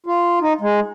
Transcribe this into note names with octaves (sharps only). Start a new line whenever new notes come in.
F4
D#4
G#3